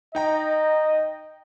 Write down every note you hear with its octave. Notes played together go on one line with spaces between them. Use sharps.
D#4 D#5 G5 A#5